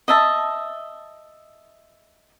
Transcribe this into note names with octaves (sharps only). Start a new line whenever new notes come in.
D#5 E5 A5